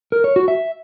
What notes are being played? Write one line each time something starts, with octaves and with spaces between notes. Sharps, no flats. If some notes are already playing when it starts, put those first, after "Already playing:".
A#4
C#5
F#4
E5